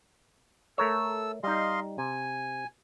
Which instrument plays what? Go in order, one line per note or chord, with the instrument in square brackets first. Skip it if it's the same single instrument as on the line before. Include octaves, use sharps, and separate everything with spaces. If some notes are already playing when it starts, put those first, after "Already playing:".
[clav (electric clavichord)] A3 A#4 C#5 [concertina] A4 E6
[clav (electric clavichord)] G3 D#4 [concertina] D#5 F5 C6
[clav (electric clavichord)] C3 [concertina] G#5